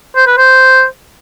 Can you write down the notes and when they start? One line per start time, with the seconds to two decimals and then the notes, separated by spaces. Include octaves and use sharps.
0.16 C5
0.27 B4
0.38 C5